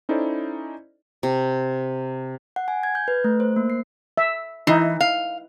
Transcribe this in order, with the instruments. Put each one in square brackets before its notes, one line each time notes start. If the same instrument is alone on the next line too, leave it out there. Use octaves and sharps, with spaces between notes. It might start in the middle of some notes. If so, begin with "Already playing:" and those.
[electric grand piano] C#4 D#4 E4 A4 C5 D5
[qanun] C3
[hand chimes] F#5
G#5
G#6
G6
B4
A3
C5
A#3
C7
[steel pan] E5
[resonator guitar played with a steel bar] E3 [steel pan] D#4 E4
[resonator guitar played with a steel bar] F5